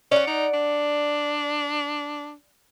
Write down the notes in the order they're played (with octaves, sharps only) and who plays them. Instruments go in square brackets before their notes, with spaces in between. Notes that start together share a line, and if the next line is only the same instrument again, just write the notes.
[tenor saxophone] C#4 [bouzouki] D5 F#5
[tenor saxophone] D#4
D4